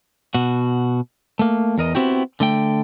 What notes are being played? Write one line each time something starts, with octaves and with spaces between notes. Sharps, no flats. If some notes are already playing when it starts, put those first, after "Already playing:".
B2 F#4
A3 A#3
E2 A#4 D#5
B3 C4 E4 F#4 G4
D3 A3 G5